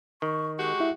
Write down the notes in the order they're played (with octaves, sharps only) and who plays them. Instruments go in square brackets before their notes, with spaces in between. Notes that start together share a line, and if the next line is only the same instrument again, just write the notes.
[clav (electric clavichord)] D#3 [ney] C#6
[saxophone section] G#3 F#4 G4 [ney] C#6
[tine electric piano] E4 E5